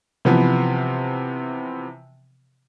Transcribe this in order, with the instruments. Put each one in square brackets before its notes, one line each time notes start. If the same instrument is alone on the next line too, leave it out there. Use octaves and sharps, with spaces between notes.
[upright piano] C3 E3 F3 B3